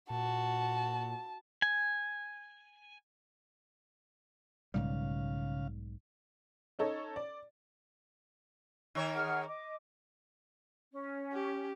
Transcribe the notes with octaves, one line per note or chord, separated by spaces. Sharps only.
A#2 F#4 A5
G#5
B1 G#2 C#3 G3 F5
C#4 D#4 A4 C#5
D5
D#3 A#4 C#5
G#4 F#5 F6
D#5 D6
C#4
G4